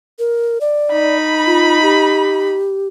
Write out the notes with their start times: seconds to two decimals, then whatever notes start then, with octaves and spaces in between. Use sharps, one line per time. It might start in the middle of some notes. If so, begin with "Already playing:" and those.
0.19 A#4
0.61 D5
0.92 D#4 B5
1.46 F4
1.82 G4